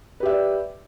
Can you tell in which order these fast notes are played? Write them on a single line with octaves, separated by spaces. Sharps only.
B4 G4 E5 D5